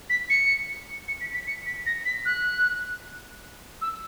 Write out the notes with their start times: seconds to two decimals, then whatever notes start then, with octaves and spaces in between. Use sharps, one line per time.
0.10 B6
0.30 C#7
1.08 C#7
1.21 B6
1.34 B6
1.47 C#7
1.66 B6
1.86 A#6
2.06 B6
2.25 F#6
3.82 E6